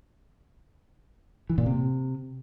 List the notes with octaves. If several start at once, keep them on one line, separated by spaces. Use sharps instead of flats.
E3
A#2
C3